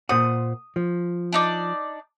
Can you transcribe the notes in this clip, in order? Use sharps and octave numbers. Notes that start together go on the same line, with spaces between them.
A#2 C5 F#5 D#6
F3
D4 D#4 D5